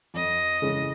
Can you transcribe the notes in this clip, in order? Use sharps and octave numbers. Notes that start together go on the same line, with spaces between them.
F2 D#5
C#3 E3 G#3 C#4